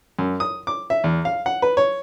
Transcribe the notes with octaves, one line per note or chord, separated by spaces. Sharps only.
F#2
D#6
D6
E5
E2
F5
F#5
B4
C#5